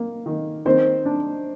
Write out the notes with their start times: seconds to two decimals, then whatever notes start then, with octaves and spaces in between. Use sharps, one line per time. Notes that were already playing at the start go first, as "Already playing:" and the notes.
Already playing: A#3
0.26 D#3
0.65 D#3 C4 C5
1.05 D4